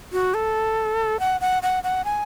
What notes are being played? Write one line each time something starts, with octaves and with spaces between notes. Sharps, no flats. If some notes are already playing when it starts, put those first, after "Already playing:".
F#4
A4
F#5
F#5
F#5
F#5
G#5